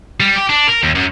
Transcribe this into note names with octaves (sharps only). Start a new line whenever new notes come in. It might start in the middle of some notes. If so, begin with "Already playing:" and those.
G3
G4
D4
A#4
D#2
F#2